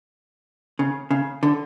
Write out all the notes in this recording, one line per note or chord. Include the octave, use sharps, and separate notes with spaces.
C#3
C#3
D3